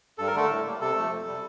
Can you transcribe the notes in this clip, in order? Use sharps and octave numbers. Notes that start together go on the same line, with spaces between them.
G2 A4
A#4
D3 A3 A4
A2
G3 A#3
C3 A4
F3 A3
F2
C3 G3